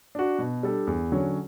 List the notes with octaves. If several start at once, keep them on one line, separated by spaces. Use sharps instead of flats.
D4 F#4
B2
G3 D4 A4
E2
D3 F#3 C#4